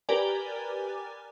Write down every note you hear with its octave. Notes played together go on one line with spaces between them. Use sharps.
G4 A#4 B4 D5 G#5